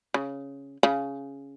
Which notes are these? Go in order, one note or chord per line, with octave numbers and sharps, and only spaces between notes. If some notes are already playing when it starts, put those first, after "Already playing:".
C#3
C#3